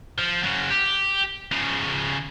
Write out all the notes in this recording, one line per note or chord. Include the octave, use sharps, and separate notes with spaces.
F3
C#3 F#3
G4
C#3 F3